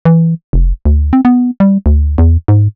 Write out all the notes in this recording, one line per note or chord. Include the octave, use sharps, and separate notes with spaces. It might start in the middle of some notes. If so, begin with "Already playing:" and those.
E3
F1
D2
C4
B3
G3
D2
E2
G#2